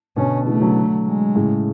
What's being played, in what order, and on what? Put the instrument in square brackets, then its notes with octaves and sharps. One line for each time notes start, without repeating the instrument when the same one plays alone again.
[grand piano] B2 D3 [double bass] C#4
[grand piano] C#3 E3 [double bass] A3
[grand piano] D3 F#3
[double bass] G#3
[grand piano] A2 C#3